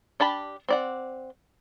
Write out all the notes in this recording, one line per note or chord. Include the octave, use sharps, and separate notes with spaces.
D4 G4 A5 B5
C4 D5 F#5